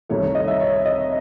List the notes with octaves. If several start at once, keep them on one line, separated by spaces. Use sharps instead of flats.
C2 C3 D#3 A3 C#5
C#5
D#5
E5
C#5
D#5